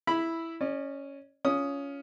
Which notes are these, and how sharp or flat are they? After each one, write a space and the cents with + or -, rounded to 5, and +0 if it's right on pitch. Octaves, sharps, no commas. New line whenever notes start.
E4 +0 B5 -5
C#4 +0 D5 +45
C#4 +15 F4 +0 D#6 +0